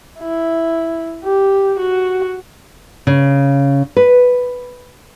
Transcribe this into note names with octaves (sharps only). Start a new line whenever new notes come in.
E4
G4
F#4
C#3
B4